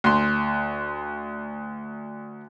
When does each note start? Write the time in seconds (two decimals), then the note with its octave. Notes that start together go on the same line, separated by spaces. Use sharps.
0.04 D2 C6